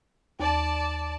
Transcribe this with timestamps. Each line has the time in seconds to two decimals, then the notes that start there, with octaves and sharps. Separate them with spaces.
0.40 D#2 D5 A5